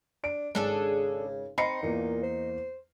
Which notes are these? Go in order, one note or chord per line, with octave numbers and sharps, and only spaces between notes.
D4 D7
G#1 C#3 D4 G#4 A4
C4 D#4 B5 C7 C#7
E2 A#2 A#3
C5